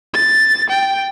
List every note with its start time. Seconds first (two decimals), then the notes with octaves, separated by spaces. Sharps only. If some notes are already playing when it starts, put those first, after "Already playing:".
0.14 A6
0.70 G5